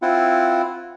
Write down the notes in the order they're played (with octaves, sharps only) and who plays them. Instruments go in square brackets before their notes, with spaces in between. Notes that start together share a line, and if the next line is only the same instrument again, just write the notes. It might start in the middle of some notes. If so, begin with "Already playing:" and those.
[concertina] C4 E4 F4 F#5